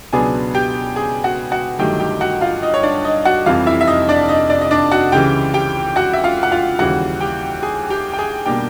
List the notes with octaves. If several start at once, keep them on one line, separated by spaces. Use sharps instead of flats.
C#2 B2 F#3 B3 D4 G#4 G#5
G4 G5
G#4 G#5
F#4 F#5
F#4 F#5
G1 G2 D#3 F#3 A3 G4 G5
G4 G5
F#4 F#5
F4 F5
D#4 D#5
C#5
D4 D5
D#4 D#5
F#4 F#5
F1 F2 C3 E3 G3 F4 F5
E4 E5
E5
D#4 D#5
D4 D5
D#4 D#5
D4 D5
D#5
D4 D5
F#4 F#5
C#2 C#3 E3 G4 G5
G4 G5
F#4 F#5
E5
F4 F5
F#5
F4 F5
D#2 C#3 E3 G3 F#4 F#5
G4 G5
G#4 G#5
G4 G5
G5
G#4 G#5
B2 G3 A#3 D4 G4 G5